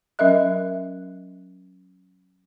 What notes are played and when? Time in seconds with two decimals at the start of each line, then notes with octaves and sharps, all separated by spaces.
0.19 F#3 C#4 A#4 D#5 E5 F#6